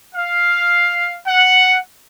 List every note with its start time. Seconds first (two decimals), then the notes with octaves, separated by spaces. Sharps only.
0.15 F5
1.27 F#5